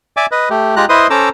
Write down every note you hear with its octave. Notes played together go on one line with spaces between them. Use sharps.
D5 E5 G#5 D6
B4 D#5
A3 G4
G#3 F4 G4 A#5 F#6
E4 B4 C5 D#5 C6 D#6
C#4 A4 C5 A#5 D6 E6